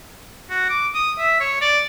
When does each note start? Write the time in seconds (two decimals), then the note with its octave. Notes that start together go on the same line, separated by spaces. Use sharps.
0.50 F#4
0.70 D6
0.94 D#6
1.18 E5
1.40 C#5
1.61 D5